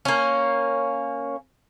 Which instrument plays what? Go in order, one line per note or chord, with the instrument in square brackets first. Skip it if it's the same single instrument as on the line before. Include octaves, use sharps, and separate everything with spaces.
[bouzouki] A#3 C#4